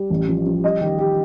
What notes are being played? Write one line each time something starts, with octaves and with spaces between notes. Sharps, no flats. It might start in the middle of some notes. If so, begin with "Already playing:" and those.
Already playing: G3
A1
F3
F3
G3 D#5
D#3 G4
G3 G4